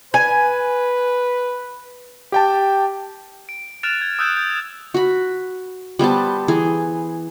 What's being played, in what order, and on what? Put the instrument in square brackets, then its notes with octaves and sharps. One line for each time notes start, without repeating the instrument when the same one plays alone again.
[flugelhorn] B4 [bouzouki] G#5
[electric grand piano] G4 G5 A5
[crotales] D7
F6 F#6 A6 D7 E7 F7
G#6
D#6 E6 F#6 G6 E7
G6
[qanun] F#4 B5
G3 B3 C5 A5
E3 G#4